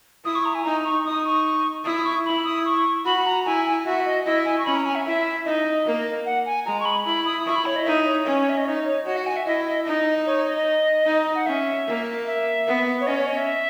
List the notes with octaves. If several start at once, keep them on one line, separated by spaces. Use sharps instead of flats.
E4 D#6
C#6
A#5
G#5
D#4 A#5
C#6
D#4 D#6
C#6
E4 D#6
D#6
C#6
E4 B5
D#6
C#6
F#4 B5
A#5
E4 G#5
G#5
F#4 E5
D#5
E4 D#5
G#5
C#6
C#4 B5
A#5
G#5
E5
E4 E5
D#4 D#5
A#3
F#5
G#5
G#3 A#5
C#6
B5
E4 B5
D#6
E4 C#6
B5
C#5
D#5
D#4 E5
C#5
C#4
E5
D#5
D#4 C#5
C#5
F#4 D#5
F#5
G#5
E5
E4 D#5
D#5
D#4 D#5
C#5
D#5
D#4
F#5
C#4 E5
A#3
E5
B3
C#5
C#4 D#5
C#5
D#5
E5